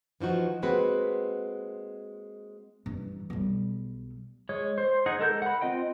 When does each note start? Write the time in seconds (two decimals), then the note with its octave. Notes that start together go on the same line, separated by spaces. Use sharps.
0.20 E3 F3 D#4 F#4
0.62 G#3 A#3 C4 F#4 B4
2.86 G2 E3
3.30 B1 G3
4.49 G#3 C#5
4.78 C5
5.06 D#4 G#4 F#5
5.19 G#3 A4 A#4 G6
5.42 F#5 B5
5.61 C4 F4 D#5 G5